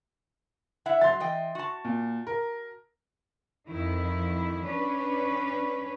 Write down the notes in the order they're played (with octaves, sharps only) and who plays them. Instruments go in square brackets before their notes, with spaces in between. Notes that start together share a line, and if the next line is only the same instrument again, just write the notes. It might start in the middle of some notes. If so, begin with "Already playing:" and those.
[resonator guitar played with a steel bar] E4 E5 F#5
[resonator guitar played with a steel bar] F#3 [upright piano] C6 A6
[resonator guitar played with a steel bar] E3 D#5 G5
F#4 A5
[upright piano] A#2
A#4
[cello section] F2 D#3 E4
C#4 D4 B4